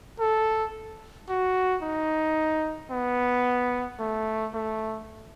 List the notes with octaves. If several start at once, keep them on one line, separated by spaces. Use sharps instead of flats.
A4
F#4
D#4
B3
A3
A3